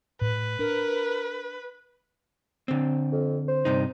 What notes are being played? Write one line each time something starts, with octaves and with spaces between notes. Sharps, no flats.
A2 B4
D4 A#4
D3 C4
F2
C5
G2 C3 D#4